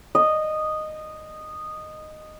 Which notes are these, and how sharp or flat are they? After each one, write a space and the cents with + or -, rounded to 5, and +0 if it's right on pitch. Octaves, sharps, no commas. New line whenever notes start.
D#5 -10